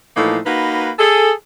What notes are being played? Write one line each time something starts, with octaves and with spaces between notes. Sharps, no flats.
A2 E3 F3 A#3 D#4 A4
A#3 D#4 F#4 B4
G#4 A4